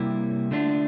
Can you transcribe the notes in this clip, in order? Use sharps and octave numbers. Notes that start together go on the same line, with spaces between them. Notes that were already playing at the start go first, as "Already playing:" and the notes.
Already playing: C3 G3 A#3 E4
D3 A3 D4 F4